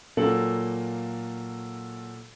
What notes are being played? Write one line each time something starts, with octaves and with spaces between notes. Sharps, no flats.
A#2 F#3 A#3 A4 F#7